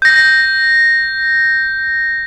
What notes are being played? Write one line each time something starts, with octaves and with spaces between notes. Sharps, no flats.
G6 A#6